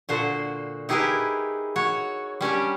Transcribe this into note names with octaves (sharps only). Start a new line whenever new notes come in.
A#2 D3 F#4 C5
D#4 E4 G4 G#4 A#4 B4
F#4 C#5
G3 C#4 D4 G4